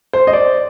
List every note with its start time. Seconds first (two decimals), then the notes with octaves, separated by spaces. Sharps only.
0.13 C5
0.27 D#5
0.33 D5